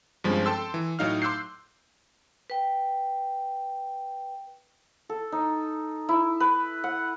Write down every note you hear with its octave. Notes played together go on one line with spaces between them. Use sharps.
G2 F3 G#3 C4 C#4
A4 G5 A5 C6 E6
E3
A2 F#3 D#4 F5 F6
C6 D6 E6 F#6 G6 C7
B4 G5
A4
D#4
E4
B4
F#5